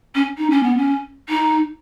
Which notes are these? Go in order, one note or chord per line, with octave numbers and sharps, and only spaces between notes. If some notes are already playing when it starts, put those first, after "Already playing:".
C#4
D#4
C#4
B3
C#4
D#4